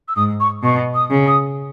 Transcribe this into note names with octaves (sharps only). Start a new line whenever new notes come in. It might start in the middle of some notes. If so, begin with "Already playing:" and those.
E6
G#2 D#6
C#6
B2 C#6
D#6
C#3
D#6